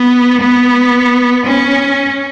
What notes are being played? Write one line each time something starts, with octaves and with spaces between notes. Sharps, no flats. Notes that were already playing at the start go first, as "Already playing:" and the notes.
Already playing: B3
B3
C#4